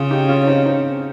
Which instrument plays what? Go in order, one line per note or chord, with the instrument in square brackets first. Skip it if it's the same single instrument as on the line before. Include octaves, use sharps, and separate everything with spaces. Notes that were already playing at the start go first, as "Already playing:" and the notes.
Already playing: [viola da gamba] C#3 [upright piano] F4 G#4
[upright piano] D#4 G4
C#4 F4
C#4
C4 D#4
C4 D#4